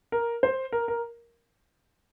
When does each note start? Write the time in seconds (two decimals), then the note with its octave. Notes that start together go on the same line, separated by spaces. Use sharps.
0.12 A#4
0.43 C5
0.72 A#4
0.88 A#4